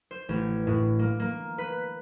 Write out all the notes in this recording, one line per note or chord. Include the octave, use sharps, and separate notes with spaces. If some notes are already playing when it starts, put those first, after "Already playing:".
C5
A1
A2
A#3
A#3
B4